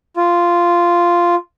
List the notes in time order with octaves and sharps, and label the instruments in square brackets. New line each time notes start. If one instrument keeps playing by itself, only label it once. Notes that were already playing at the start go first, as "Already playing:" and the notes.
[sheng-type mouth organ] F4